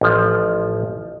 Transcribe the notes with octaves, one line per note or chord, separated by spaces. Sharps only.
A1 F3